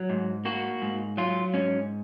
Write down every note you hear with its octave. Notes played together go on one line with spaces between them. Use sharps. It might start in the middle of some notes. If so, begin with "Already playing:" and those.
Already playing: F#3
G#2
A#3 F#4
G#2
F#3 F4
G#2 C#4